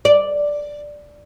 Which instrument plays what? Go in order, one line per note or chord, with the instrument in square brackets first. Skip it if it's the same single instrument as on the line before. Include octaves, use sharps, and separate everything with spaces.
[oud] D5